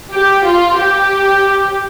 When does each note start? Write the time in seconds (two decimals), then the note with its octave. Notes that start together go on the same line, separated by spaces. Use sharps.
0.14 G4
0.45 F4
0.75 G4